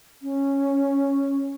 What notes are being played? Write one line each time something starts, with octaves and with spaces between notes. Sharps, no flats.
C#4